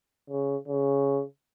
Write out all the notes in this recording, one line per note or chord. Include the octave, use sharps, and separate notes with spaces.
C#3
C#3